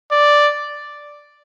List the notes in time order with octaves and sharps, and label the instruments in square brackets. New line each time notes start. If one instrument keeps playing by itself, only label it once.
[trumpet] D5